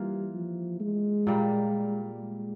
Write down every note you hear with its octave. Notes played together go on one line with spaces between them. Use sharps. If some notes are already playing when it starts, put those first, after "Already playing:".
Already playing: E3 G3 A#3 F4
F3
G#3
A#2 G3 A#3
G#3